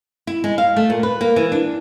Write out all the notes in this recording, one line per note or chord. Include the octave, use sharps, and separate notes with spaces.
E4
G#3
F5
A3
A#2
B4
A#3
E3
D4